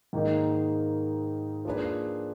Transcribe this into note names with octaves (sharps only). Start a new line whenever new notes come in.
G#2 D#3 A#3 D#4 A#4
F3 A#3 D4 G#4 B4